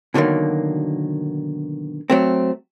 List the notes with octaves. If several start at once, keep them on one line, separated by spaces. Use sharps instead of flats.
B2 D3 D#3 F#3 A#3
F#3 A3 C4